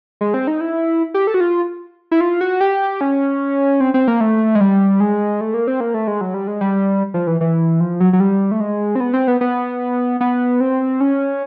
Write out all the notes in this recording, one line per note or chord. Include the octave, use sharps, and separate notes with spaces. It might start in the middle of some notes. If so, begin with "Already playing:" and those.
G#3
C4
D#4
E4
G4
A4
F#4
F4
E4
F4
F#4
G4
C#4
C4
C4
A#3
A3
G#3
G3
G#3
A3
A#3
C4
A#3
A3
G#3
F#3
G3
G#3
G3
F3
E3
E3
F3
F#3
F#3
G3
A3
G#3
C4
B3
C4
B3
B3
B3
C4
C#4